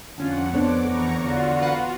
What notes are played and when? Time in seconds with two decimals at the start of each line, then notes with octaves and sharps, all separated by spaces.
0.18 F2 D3 C#4 F4 F#5
0.54 B3 D4 A4 C5 C#5 D6
0.85 E2 B3 A4 A#5 C#6
1.18 D3 F4 F#4
1.62 B4 F5 F#5